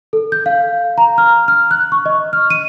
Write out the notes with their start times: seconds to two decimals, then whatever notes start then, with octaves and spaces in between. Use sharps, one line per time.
0.13 A4
0.32 G6
0.46 F5
0.98 A#5
1.18 F6
1.48 F6
1.71 F#6
1.92 C#6
2.06 D#5
2.33 F6
2.50 D#7